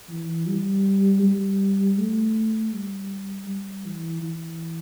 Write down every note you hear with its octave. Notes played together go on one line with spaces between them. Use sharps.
E3
G3
G3
A3
G3
G3
E3
E3